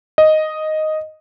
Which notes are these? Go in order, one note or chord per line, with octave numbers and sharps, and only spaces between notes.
D#5